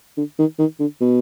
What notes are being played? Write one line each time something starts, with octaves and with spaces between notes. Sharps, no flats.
D3
D#3
D#3
D3
B2